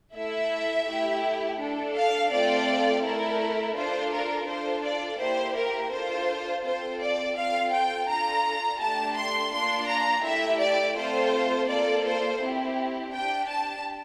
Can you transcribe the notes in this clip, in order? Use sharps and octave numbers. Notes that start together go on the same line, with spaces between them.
A3 E4 A4 E5
A3 E4 G4
D4 A4
F5
A3 C4 F4 A4 D5
A3 E4 A4 A#4
D4 F4 A4 C5
A#4
D4 F4 A4 C5
D5
A#3 E4 G4 C5
A#4
D4 F4 A4 C5
C4 F4 A4 C5
D5
C4 F4 A4 F5
G5
D4 F4 A4 A#5
A3 D4 G4 A5
C6
A#3 D4 F4 C6
A#5
A3 E4 G4 E5
D5
A3 C4 F4 A4 C5
A#3 F4 A4 D5
C5
C4 E4 G4
D4 G4 G5
A5